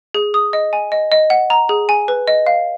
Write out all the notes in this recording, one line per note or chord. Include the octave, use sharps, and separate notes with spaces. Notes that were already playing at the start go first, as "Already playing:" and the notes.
G#4
D#6
D#5
G#5
D#5
D#5
F#5
A#5
G#4
G#5
B4
D#5
F5